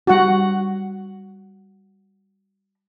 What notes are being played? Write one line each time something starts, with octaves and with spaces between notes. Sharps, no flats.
G3 D4 F#4 F#5